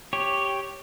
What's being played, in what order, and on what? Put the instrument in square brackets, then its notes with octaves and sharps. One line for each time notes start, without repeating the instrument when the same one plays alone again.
[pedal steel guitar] G4 C#5